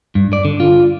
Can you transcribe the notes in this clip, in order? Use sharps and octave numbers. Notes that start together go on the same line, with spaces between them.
G2
D5
D3
F4